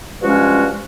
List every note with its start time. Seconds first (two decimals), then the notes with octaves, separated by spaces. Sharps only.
0.21 G2 F3 G#3 C#4 F#4